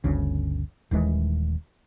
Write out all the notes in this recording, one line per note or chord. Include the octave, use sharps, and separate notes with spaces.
G1 D2 C#3
D#1 D#2 E3 G#3